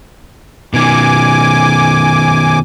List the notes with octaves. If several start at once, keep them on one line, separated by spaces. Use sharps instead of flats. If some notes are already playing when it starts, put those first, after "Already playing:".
B2 D#3 G#5 D6